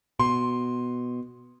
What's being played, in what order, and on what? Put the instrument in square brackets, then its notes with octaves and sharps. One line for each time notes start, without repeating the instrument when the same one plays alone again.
[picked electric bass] B2 [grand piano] C6